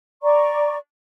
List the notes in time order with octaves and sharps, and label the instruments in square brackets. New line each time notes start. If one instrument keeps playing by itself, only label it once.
[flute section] D5 A#5 C#6